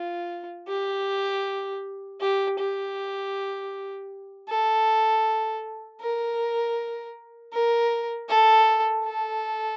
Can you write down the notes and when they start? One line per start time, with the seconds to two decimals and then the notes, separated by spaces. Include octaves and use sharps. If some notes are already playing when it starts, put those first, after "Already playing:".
Already playing: F4
0.68 G4
2.21 G4
2.59 G4
4.48 A4
6.01 A#4
7.53 A#4
8.29 A4
9.05 A4